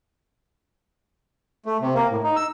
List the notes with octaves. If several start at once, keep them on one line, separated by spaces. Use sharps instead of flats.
A3
C3
A#3
A2
D#4
E6